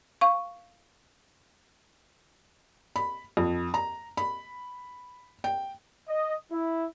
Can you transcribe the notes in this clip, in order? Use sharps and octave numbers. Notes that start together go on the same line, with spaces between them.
F5 C#6
B5
F2
A#5
B5
G5
D#5
E4